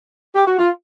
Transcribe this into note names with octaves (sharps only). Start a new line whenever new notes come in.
G4
F#4
F4